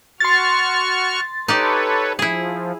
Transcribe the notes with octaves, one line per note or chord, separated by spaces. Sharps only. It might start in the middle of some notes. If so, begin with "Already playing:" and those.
F#4 C6 C#6 F6 A6
D#4 G4 A4 B4 C#5 D5
F3 E4 G#4